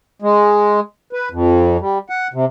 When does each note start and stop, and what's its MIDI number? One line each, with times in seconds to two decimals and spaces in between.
0.22 0.80 56
1.13 1.29 71
1.32 1.77 41
1.81 1.98 55
2.10 2.28 78
2.34 2.45 48